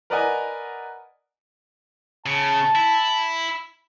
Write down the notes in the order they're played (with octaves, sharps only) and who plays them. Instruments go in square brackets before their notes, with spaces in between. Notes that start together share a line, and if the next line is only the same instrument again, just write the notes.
[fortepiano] A#4 B4 D5 D#5 F#5 G#5
[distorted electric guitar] C#3 [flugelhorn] A5
[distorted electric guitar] E4